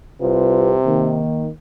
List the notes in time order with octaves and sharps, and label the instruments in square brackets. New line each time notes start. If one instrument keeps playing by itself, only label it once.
[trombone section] C2 F4 B4 [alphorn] C3
[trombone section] D#3 A#3